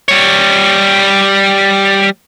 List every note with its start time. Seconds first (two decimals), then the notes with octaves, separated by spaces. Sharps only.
0.09 G3 C#5